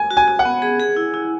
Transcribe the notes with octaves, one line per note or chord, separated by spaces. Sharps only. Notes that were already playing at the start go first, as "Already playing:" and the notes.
Already playing: G#5
F#4
G#5
F#4
F#5
B3
G#4
G#4
E4
E4